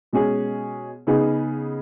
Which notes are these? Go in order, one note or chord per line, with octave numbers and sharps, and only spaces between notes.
B2 G#3 C#4 G#4
C#3 B3 D#4 G#4